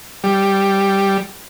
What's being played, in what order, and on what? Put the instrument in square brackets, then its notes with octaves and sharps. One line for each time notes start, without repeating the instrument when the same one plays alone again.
[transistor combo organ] G3